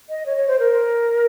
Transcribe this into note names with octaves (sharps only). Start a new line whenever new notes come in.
D#5
C#5
C#5
C5
A#4